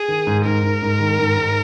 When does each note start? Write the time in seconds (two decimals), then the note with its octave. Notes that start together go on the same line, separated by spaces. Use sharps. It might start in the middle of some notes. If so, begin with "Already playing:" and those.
Already playing: G#4
0.08 D#3
0.27 G#2
0.45 G#2 A#4
0.63 G#2
0.82 G#2
1.00 D#3
1.19 G#2
1.37 G#2